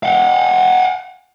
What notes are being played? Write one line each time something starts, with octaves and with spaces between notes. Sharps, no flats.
F5 F#5